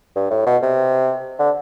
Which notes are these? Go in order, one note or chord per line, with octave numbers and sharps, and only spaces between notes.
G2
A2
B2
C3
D3